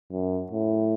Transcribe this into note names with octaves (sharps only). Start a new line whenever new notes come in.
F#2
A2